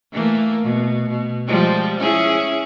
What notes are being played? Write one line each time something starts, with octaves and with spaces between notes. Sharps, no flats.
E3 A3 A#3
B2
B2
F3 G3 G#3
C#4 E4 G#4